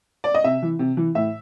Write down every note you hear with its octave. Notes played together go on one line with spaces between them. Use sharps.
D5
D#5
C3 E5
E3
C3
E3
A2 E5